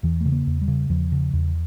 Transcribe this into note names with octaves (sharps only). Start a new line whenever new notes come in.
E2 E3
C#3 A3
A#3
E2
G3
C#3
E2 F3
C#3
E2